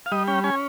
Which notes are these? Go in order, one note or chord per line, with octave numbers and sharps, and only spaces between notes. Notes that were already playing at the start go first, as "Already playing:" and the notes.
F5
G3 D#5
C#4 G5
C#4 G#5